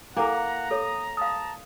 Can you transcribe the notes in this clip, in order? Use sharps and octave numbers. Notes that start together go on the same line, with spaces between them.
A#3 D4 E4 A4 F#5 A#5
A4 C#5 D#6
F5 A5 D#6